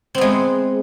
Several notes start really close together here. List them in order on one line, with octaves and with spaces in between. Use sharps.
C4 B3 G#3